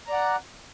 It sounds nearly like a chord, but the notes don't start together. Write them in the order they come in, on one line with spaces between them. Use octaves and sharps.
A#5 D5 F#5